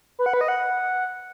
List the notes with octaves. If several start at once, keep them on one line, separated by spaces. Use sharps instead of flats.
B4
F#5
B4
D#5
F#5